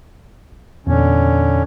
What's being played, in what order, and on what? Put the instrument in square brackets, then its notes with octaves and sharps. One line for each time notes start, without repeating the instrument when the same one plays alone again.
[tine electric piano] E2 A#2 [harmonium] D3 C#4